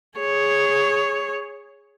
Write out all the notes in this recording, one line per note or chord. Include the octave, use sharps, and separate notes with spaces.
G#4 C#5